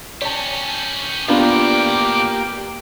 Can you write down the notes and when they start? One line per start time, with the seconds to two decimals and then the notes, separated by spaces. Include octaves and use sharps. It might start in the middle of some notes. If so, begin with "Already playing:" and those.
0.22 C#4 G4 C#5 A5
1.28 A2 E3 A#3 B3 D4 F4 G4 D6